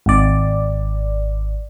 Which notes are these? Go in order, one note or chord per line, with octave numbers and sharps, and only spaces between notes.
G#1 D5